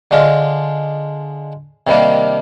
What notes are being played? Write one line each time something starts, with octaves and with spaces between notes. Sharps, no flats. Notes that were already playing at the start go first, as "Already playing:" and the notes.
D3 G#3 D4 F4
C3 D#3 G3 A#3 D4